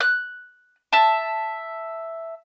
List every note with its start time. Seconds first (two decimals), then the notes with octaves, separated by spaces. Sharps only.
0.01 F#6
0.92 E5 A5